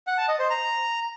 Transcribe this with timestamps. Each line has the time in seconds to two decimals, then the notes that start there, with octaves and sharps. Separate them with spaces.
0.07 F#5
0.18 A5
0.28 D#5
0.39 C5
0.50 A#5